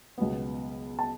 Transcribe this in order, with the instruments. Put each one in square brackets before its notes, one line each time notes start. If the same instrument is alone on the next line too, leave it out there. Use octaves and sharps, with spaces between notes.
[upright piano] C#2 B2 F#3 B3
A5